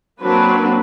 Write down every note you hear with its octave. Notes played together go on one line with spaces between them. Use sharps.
F#3 A#3 C4 D4 F#4 B4